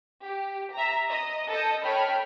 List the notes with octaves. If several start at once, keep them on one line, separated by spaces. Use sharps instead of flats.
G4
E5 A#5
D#5
A4 D#5 G6
A4 C#5 G5 B5 F6